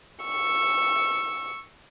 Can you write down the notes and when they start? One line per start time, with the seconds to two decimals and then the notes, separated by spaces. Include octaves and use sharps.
0.24 C#6 E6